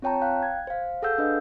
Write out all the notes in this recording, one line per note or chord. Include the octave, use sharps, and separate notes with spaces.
C4 F4 C#5 G5 A5 A#5
F5 G5 F#6
G#6
C5 F5
G#4 A4 F5 F#5 E6 G6
D4 B4 D#5